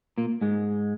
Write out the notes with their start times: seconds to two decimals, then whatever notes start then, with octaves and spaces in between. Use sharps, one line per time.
0.18 A#2 A#3
0.41 G#2 G#3